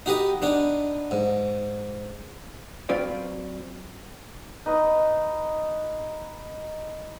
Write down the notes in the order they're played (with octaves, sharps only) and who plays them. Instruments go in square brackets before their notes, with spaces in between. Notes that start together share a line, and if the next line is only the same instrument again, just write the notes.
[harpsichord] D#4 F#4 G4 B4 D#5
B3 D4 D#4
G#2
[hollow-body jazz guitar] F#3 C4 F4 B4 D5
[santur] D#4 B4 D#5